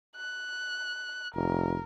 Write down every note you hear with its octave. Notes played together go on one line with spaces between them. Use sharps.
F#6
F1 A#4